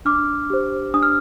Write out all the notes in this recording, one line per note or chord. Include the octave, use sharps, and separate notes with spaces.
D4 D6 F6
G4 C5
D4 D#6
F6